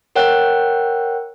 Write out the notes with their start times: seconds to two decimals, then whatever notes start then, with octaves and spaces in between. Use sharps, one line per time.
0.16 A#4 C#5 F#5 G5 F#6